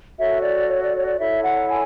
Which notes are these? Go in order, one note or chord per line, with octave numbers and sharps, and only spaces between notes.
F#4 A4 C#5 E5
D5
C#5
D5
C#5
D5
E4 A4 C#5 E5
F#5
G#5